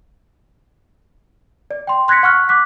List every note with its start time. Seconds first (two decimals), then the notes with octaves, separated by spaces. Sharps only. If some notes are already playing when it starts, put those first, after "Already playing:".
1.71 D5
1.87 G5 C6
2.08 C6 F#6 G#6 A#6 B6 C#7
2.23 F#5 C#6 F6 F#6
2.49 D6 F#6 B6